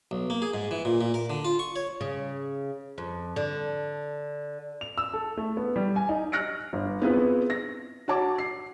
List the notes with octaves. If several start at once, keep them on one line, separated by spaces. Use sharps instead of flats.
B1
A#3
G#4
G#2
E3
A#2
A#2
A#4
D3
F4
C#6
C#5
C#3
F2
D3
F7
E6
A4
A3
B3
G3
G#5
D#4
F6 F#6 A#6 C#7 D7
G1
B3 C4 E4 F4 G#4 B4
A#6
F#4 C#5 A5 D6
C7